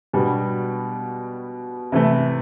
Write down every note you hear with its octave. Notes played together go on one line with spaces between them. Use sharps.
B2 G3 B3 D4 F#4
C3 E3 A3